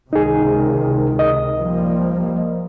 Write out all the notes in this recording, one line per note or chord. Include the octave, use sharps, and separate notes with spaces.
C#2 C3 D#3 D#4 G#4
D#5
F3 G3 A#3